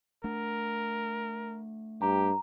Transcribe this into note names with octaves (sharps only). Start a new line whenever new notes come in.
A3 D4 A#4
G2 G4 A#5